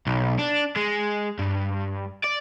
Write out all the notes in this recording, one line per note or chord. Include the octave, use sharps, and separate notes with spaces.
B1
D4
G#3
G2
D5